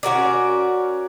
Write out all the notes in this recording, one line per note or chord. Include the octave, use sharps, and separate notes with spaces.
C#4 F#4 A#4 D5